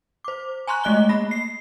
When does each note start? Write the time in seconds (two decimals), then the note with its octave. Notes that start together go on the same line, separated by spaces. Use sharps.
0.24 C5 D6
0.67 G#5 A#5 C6 C#6 F#6
0.84 G#3 A3 D#5 F#6 G7
1.09 A#3 B5 A#6
1.31 C7